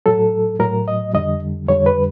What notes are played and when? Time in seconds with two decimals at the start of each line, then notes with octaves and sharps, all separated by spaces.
0.06 A2 F#3 A4
0.59 A2 F#3 A#4
0.88 D#5
1.14 F2 D3 G3 D#5
1.68 F2 D3 G3 C#5
1.86 B4